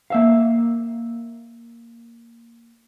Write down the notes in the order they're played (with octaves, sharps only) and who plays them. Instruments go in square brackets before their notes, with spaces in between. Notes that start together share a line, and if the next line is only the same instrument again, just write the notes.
[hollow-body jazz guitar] A#3 E5 F5